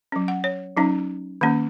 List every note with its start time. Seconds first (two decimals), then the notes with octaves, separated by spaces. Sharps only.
0.12 F#3 C#4
0.28 F#5
0.44 C#5
0.77 F#3 C#4 D#4
1.41 D#3 A#3 C#4